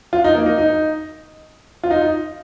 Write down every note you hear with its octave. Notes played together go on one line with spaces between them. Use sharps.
F4
D#4
A#3
D#4
D#4
F4
D#4